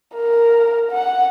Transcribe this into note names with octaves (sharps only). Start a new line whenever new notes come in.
A#4
F#5